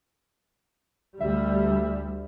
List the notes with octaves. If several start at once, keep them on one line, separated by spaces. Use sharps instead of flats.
D2 G3 E5